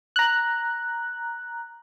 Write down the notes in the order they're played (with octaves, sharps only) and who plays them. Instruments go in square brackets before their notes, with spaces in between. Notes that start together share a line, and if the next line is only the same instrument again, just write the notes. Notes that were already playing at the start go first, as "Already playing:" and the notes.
[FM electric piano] A#5 F#6